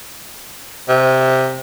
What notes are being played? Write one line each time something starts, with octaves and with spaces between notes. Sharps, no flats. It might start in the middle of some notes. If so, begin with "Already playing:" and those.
C3